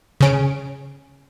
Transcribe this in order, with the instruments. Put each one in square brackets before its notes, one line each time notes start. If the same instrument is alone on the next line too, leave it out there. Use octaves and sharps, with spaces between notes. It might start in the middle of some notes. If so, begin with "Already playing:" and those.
[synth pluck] C#3 C#4 D7